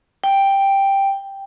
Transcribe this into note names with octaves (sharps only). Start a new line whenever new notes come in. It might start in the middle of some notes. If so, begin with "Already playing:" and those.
G5